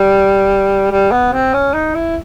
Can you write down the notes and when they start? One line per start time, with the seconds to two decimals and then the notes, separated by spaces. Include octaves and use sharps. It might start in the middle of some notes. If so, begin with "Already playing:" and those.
Already playing: G3
0.91 G3
1.11 B3
1.33 C4
1.53 C#4
1.74 D#4
1.94 E4